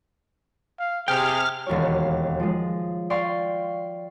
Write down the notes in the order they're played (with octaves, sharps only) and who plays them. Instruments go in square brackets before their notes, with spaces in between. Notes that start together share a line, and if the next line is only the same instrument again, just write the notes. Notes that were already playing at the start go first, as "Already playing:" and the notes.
[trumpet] F5
[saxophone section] C3 [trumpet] G#4 [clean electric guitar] G5 [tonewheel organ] F6
[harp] E1 D#2 F#4 C#5
C#7
F3 G#3
D5 F5 G5 C6 C#6